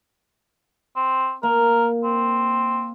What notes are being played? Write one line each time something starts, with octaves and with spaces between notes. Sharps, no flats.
C4
A#3 A#4
C4